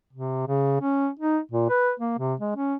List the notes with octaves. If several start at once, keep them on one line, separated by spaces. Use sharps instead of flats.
C3
C#3
C#4
D#4
A#2
B4
A#3
C3
G#3
C#4